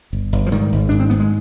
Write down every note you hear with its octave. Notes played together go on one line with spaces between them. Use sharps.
G1
G1
F3
G#2 D#3 G3
G#1
G#2 D4
C4
G#2 B3
G#3